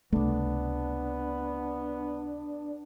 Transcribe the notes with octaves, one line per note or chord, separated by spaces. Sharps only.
C#2 C3 A3 B3 D4